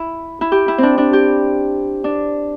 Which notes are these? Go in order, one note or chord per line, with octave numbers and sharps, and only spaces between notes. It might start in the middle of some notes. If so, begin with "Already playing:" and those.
Already playing: E4
E4
G4
E4
C4 D4
D4
G4
D4